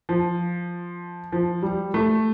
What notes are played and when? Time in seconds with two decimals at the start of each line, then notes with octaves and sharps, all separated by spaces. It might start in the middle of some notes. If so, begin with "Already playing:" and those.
0.09 F3
1.32 F3
1.63 G3
1.94 A3